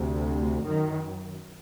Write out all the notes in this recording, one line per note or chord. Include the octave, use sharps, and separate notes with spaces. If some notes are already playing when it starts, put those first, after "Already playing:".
Already playing: D2 C3
F#2 D#3